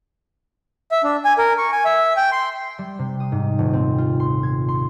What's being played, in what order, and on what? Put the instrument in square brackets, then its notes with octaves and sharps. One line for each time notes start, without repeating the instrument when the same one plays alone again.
[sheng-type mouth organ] E5
D4
G#5
A#4
C#6
G#5
E5
G5
C6
[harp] G3
C3
D#6
G#2
D#1
C4
F4
C6
G#6
C6